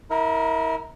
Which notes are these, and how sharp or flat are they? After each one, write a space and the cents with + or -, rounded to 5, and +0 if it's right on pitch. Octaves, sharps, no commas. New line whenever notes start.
E4 -35 A#4 +0 F5 +40